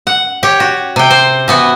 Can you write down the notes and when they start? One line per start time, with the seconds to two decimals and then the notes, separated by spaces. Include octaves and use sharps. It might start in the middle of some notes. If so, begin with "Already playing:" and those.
0.07 F#5
0.43 G4 C#5
0.60 F#4
0.96 C3 G5
1.11 C5
1.48 E3 B3 F#4